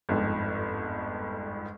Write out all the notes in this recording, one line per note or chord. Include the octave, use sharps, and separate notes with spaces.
G1 F2 G#2